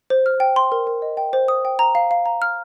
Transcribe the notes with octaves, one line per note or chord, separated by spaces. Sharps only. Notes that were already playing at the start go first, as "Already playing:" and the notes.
C5
F6
G5
C6
A#4
A#4
D#5
G5
C5
D#6
G5
A#5
F5
F5
A#5
F6